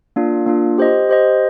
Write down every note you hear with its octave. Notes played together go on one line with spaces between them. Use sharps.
A#3 D4 F4
A#3 D4 F4
G4 C5 D#5
G4 C5 D#5